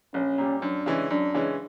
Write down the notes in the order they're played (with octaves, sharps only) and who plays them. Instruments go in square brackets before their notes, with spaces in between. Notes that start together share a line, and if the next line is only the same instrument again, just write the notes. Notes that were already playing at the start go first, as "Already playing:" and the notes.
[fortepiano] A#1 [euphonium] C#4
[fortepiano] A#2 G3
[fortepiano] F#2 [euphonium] D4
[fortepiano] C#3 E3 G#3 C#4
[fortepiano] F#2 [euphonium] D4
[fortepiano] C#3 E3 G#3 C#4